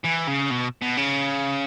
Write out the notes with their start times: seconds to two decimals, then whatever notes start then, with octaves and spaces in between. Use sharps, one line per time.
0.05 E3
0.28 C#3
0.51 B2
0.82 B2
0.97 C#3